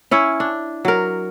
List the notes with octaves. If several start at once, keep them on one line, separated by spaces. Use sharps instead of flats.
C#4 E4 C#5
D4
F#3 A#4